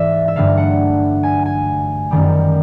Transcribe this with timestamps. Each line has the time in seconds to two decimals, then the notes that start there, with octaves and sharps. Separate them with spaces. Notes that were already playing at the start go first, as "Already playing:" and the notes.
Already playing: G#2 E3 G#3 D5 E5
0.28 E5
0.36 G2 D3 F#3 A3 F5
0.57 F#5
1.23 G#5
1.45 G#5
2.11 F#2 D#3 G3